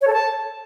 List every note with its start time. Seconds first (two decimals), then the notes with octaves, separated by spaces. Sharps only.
0.01 C#5
0.07 A4
0.13 A5